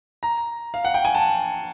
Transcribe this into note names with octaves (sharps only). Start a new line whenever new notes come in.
A#5
F5
F#5
G5
G#5
A5